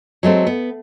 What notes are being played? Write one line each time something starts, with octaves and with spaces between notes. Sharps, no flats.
F#3 G#3 A3 C4
B3